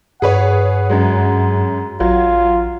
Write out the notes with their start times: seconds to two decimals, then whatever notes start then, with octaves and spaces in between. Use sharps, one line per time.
0.22 G2 G#4 B4 C#5 F#5
0.89 F#2 F#3 G#3
2.00 A1 F#3 F4